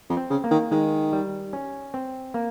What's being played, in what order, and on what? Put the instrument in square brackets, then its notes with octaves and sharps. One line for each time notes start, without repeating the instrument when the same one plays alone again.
[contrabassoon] F2
[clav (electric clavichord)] C4
[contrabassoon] C#3
[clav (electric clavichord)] A#3
[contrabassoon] D#3
[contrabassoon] D#3 [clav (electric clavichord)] G#3
[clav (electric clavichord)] G3
C#4
C4
A#3